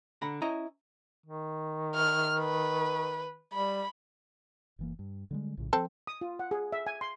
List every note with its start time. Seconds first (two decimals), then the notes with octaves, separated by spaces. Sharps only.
0.22 D3 F#5 A#5 B5
0.42 C#4 E4 D#5 A#5
1.26 D#3
1.95 F6
2.39 B4
3.54 G3 B5
4.79 F#1 E3 A#3
4.99 G2
5.31 D3 G3 G#3
5.57 A#1 A2 C#3
5.73 E3 F3 C4 A4
6.07 D#6
6.21 F4
6.39 F#5
6.51 G#4
6.72 E5
6.87 G#5
7.01 C6